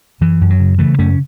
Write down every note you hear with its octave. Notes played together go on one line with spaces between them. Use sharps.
F#2 E3
F#2
F#3
C#3
C#3 E3 A3
F#2 A3 C#4